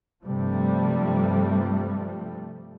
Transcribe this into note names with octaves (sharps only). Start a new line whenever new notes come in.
G2 C3 F3 G3 A3